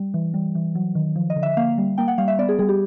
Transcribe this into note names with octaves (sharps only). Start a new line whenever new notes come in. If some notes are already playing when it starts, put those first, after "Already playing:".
Already playing: G3
E3
G3
E3
F#3
D#3
F3
D#5
D3
E5
A#3 F5
G3
A#3 G5
F#5
G3 F5
E5
B3 D5
G#4
G3 G#4
G4